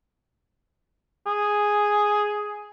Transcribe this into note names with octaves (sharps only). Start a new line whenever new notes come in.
G#4